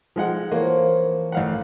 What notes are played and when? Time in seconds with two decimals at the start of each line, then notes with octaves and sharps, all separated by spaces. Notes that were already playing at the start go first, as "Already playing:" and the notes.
0.16 F3 G#3 F#5
0.52 E3 F3 A#3 A#4 C#5
1.32 A1 F5 F#5